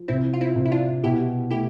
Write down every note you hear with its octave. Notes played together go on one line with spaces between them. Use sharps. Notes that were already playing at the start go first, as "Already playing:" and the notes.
Already playing: F3
C3 C4 E4
F4
C4 E4
C3
E4
D4 F4
B2 E4 G4
A3 E4 G4